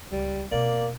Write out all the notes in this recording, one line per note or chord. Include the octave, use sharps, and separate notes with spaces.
C#2 G3
B2 A#3 C4 D5